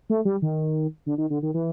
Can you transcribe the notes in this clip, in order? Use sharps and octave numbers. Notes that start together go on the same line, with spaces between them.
A3
G3
D#3
D3
D#3
D3
D#3
E3